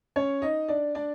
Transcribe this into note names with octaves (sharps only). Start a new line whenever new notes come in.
C#4 C#5
D#4 D#5
D4 D5
D4 D5